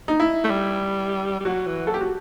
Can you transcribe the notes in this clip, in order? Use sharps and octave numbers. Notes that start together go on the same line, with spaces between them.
D#4
E4
A3
G3
G3
F#3 F#4
E3
F#3 A4
G4
F#4